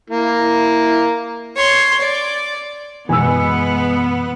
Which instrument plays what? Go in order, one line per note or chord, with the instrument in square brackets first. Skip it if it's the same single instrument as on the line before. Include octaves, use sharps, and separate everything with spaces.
[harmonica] A#3 [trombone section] E4
[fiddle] C#5 C6
D5
[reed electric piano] F#2 B2 E3 [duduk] G#3 [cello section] B3 [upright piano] G#5 E6